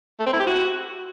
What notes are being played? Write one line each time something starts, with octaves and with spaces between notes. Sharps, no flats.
A3
C4
E4
G4
F#4